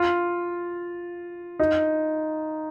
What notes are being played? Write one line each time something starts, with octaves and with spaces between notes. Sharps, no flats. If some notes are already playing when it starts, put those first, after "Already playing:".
Already playing: F4
D#4